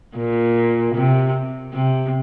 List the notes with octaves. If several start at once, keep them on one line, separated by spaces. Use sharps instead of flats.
A#2
C3
C3